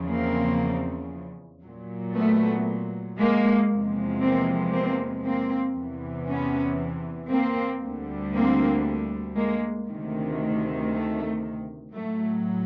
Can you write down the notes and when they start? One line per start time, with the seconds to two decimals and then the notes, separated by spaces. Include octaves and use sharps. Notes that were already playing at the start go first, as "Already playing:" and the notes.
Already playing: E2 C#3 F3
0.09 A#3 C4
1.63 A#2 F#3
2.15 A3 B3
3.18 G#3 A#3
3.69 E2 C3 F3 G#3
4.21 A#3 C4
4.72 A#3 C4
5.23 A#3 C4
5.75 E2 C3 E3
6.28 B3 C#4
7.30 A#3 C4
7.82 D2 D3 G3
8.33 A#3 C4
9.36 G#3 A#3
9.87 D2 C3 D#3
10.91 A3
11.94 A2 F#3 A3